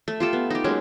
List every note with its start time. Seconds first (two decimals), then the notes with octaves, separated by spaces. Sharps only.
0.08 A3
0.20 F4 G4 A4
0.33 B3
0.50 D#4 G4
0.64 F#3 G#3 A#3 C#4